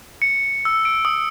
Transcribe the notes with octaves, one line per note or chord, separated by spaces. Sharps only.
C#7
E6
D7
D#6